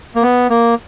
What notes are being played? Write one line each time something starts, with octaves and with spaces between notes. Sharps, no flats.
A#3
B3
A#3